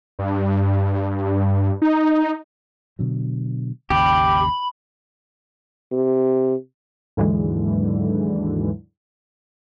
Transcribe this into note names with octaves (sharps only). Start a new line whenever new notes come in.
G2
D#4
B2 D3 F#3
G#1 D#2 C#3 G4 B5
C3
D#2 G#2 D3 E3 F#3 G#3